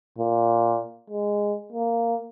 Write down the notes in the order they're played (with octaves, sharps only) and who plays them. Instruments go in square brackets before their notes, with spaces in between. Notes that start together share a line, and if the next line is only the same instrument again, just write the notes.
[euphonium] A#2
G#3
A#3